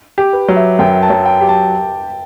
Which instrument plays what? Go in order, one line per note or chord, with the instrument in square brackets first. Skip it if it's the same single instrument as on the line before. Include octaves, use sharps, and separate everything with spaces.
[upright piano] G4
[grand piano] B4
[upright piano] F#3
[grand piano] E5
[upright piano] F#2 [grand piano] G5
[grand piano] A5
[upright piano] F#3
[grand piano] G5
[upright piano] G4
[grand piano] A5